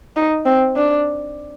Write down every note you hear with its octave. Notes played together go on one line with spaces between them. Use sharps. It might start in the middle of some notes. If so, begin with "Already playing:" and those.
D#4
C4
D4